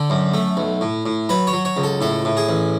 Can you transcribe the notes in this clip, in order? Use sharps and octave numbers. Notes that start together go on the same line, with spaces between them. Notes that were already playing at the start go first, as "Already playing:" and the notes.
Already playing: D3 A4
F#2
A3
B1
A2
A2
F#3 B4
C#5
F#3
C#5
C#2
A4
A2 A4
A2
G#4
A1